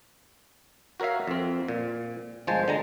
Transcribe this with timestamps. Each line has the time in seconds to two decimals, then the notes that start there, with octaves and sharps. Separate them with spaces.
1.00 F#4 A#4 C#5 E5 F5
1.27 F2 C4
1.68 A#2
2.47 G1 F3 G#3 C5 G#5 A5
2.68 D3 G#3 A#5